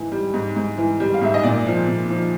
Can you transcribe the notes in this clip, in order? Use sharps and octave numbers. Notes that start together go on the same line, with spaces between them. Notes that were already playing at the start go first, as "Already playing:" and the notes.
Already playing: G#2 E3
G3
G#2
G#2
E3
G3
F5
G#2 E5
D#5
A#2 D5
F3
A#2
F3